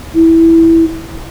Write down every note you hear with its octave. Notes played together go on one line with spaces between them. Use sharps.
E4